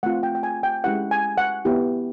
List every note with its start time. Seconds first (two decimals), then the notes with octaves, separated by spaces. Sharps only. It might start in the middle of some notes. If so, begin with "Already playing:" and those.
0.03 A3 C4 F4 F#5
0.23 G5
0.35 G5
0.43 G#5
0.63 G5
0.84 G#3 C#4 E4 G4 F#5
1.11 G#5
1.38 F#5
1.65 B3 E4 G4